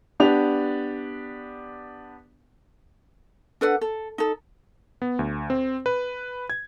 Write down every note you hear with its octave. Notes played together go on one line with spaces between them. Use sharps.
B3 D4 G4 F7
D4 A4 B4 F#5
A4
D#4 A4
B3
D2
C4
B4
G#6